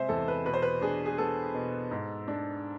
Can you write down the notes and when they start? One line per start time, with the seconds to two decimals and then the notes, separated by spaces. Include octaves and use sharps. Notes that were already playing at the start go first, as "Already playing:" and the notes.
Already playing: C3 G#3 C4 C5 E5 G#5
0.09 E2 A4
0.28 B4
0.45 B2 B4
0.53 C5
0.62 B4
0.81 D4 G#4
1.06 G#4
1.18 B3 A4
1.55 B2
1.91 G#2
2.28 D4